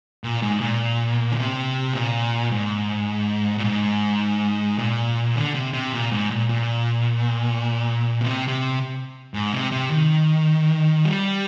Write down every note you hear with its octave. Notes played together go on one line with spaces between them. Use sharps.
A#2
G#2
A#2
D3
C3
A#2
G#2
A#2
G#2
A#2
D3
C3
C3
A#2
G#2
A#2
A#2
C3
C3
G#2
C3
C3
D#3
G3